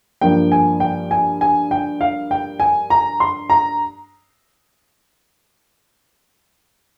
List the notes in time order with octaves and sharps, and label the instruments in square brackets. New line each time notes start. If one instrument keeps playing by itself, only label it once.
[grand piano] G2 F3 A#3 G5
G#5
G5
G#5
G#5
G5
F5
G5
G#5
A#5
C6
A#5